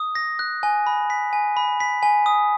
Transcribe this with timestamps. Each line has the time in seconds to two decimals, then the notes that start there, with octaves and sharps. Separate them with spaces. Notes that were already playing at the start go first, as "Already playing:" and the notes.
Already playing: D#6
0.15 A#6
0.39 F#6
0.63 G#5
0.87 B5
1.10 B6
1.33 G#5
1.57 B5
1.80 B6
2.03 G#5
2.26 D#6